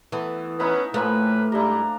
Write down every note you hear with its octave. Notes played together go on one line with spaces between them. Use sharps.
E3 A3 B3
B3 C#4 D#4 E4 E5
A2 E3 F3 A3 A#3 B4
G#2 G3 D4 E4 A#5